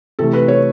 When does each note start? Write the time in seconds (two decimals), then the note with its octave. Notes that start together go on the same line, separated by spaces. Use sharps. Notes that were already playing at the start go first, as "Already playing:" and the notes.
0.19 C3 E3 A3 A4
0.33 B4
0.48 C#5